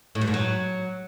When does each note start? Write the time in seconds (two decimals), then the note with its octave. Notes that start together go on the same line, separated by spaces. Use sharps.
0.15 A2
0.21 G2
0.28 G#2
0.34 F#3